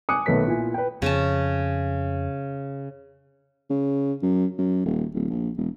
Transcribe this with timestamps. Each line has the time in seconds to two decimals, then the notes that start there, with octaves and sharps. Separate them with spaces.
0.09 G#5 D6 D#6 F#6 C#7
0.26 B1 D#3 A3 B4 B6
0.47 A#2 B3 E4 G#5
0.74 B4 G5
1.02 F2 C#3 C#4 A5
3.70 C#3
4.22 F#2
4.58 F#2
4.85 D#1
5.14 D1
5.30 A#1
5.57 E1